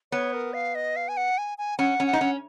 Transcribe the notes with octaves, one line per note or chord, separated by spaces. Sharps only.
B3 C#5
A#4
F5
D#5
F5
G#5
F#5
G#5
G#5
C#4 F#5
C#4
F#5
D#4
C#4